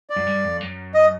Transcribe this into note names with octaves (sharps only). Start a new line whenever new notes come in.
D5
F#2
G2
F2
F#2
D#5